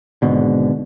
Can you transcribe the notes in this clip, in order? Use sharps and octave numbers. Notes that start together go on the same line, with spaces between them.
G#1 G#2 B2 D3